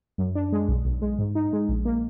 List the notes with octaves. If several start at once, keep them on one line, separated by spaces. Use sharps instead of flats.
F#2
D4
G#3
B1
B1
G#3
G#2
D#4
G#3
A#1
A#3